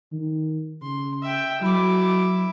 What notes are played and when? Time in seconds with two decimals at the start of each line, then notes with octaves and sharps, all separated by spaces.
0.12 D#3
0.82 C#3 C6
1.22 E5 G5
1.61 F#3 E4 D6